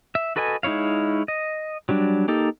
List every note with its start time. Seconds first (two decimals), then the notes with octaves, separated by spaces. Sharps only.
0.15 E5
0.36 F#4 A4 B4 D#5 G#5
0.63 G#3 D#4 E4 C#5 F5
1.28 D#5
1.89 F#3 G3 D4
2.28 A#3 D#4 G4 A4